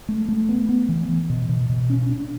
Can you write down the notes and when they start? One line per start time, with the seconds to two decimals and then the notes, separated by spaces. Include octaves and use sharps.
0.09 A3
0.29 A3
0.49 B3
0.69 B3
0.89 E3
1.08 E3
1.30 B2
1.49 B2
1.70 B2
1.90 C#4
2.10 D4